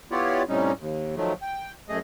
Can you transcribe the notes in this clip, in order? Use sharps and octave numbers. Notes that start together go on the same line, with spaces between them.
B3 E4 F4 G4 C#5 D5
A2 C3 G3 C#4 D#4
D#2
D#3 F3 F#3 A3
G5
F#2 A3 G#4 D#5